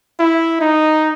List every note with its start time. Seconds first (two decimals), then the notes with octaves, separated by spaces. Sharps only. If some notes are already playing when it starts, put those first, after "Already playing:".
0.20 E4
0.61 D#4